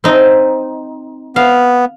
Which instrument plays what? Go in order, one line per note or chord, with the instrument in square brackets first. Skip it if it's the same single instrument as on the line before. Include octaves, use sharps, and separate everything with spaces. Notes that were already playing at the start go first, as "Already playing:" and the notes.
[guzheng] C4 D#4
[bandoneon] B3 [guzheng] F5